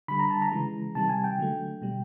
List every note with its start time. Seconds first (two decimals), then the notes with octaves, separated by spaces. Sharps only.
0.08 D3 G3 B5
0.19 A#5
0.30 A5
0.42 A#5
0.51 C#3 E3 G#3
0.95 C3 D#3 G3 A5
1.09 G#5
1.24 G5
1.38 D3 F#3 A3
1.82 B2 G3